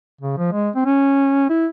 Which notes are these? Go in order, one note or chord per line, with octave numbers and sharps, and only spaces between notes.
C#3
F3
G#3
C4
C#4
E4